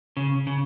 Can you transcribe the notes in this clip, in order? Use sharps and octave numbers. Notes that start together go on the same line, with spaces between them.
C#3
C#3